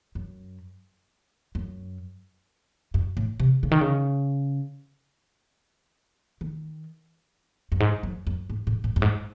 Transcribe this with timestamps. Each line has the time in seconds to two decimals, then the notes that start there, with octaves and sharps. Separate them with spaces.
0.15 F#2
1.55 F#2
2.94 F#2
3.17 A2
3.40 C3
3.63 C#3
3.71 D#3
3.81 C#3
6.41 D#3
7.72 F#2
7.80 G#2
8.03 F#2
8.27 F#2
8.50 G#2
8.67 A2
8.84 A2
8.96 F#2
9.02 G#2